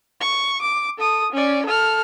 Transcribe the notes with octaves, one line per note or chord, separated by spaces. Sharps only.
C#6
D6
A4 D#6
C#4 D5
A4 F6